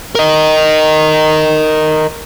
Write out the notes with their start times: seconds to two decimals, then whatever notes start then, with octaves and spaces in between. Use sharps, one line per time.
0.15 A#4 D#5